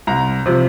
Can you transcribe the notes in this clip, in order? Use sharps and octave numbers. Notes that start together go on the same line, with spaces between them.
C2 A#5
C3 F3